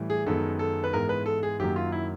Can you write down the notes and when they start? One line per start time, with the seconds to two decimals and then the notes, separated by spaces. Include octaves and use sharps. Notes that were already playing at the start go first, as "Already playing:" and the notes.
Already playing: A2 E3 G3
0.10 G#4
0.26 F#2 D#3 G#3 B3 A4
0.59 A4
0.84 B4
0.93 G#2 E3 G#3 B3 A#4
1.09 B4
1.26 A4
1.43 G#4
1.60 F#2 D#3 F#3 A#3 G4
1.76 F4
1.92 E4